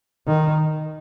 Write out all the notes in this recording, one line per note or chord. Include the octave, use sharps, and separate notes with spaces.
D#3